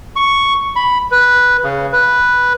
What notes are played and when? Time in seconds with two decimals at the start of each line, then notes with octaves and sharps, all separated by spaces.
0.16 C#6
0.76 B5
1.11 B4
1.64 C#3
1.93 B4